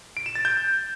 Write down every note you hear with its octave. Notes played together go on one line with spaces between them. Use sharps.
D7
E7
A6
G6